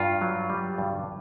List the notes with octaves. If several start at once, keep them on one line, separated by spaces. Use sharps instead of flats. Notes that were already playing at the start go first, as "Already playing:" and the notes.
Already playing: G2 F4
F#3
G3
G2